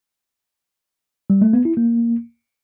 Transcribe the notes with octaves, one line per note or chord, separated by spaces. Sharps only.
G3
A3
B3
E4
A#3